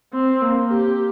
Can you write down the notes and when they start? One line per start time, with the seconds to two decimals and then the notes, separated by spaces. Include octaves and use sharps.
0.13 C4
0.41 A#3
0.70 G4